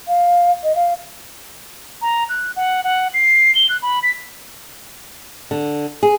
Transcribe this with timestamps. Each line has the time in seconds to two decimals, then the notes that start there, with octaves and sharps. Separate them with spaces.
0.08 F5
0.63 D#5
0.75 F5
2.02 A#5
2.29 F#6
2.56 F#5
2.84 F#5
3.14 C7
3.55 G7
3.69 F#6
3.82 B5
4.03 B6
5.51 D3
6.03 G#4